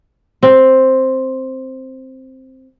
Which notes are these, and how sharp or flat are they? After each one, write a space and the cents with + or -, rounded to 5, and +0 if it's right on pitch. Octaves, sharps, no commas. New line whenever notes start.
C4 +5